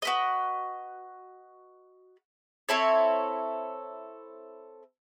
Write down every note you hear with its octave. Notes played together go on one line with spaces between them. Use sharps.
F#4 B4 D#5
C4 E4 A4 C#5